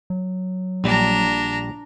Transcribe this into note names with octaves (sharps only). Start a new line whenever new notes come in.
F#3
A#1 G3 D4 A#5